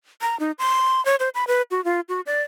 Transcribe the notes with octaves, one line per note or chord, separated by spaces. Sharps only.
A#5
D#4
C6
C#5
C5
B5
B4
F#4
F4
F#4
D5